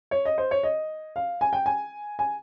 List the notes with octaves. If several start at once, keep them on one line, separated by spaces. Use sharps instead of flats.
C#5
D#5
C5
C#5
D#5
F5
G#5
G5
G#5
G#5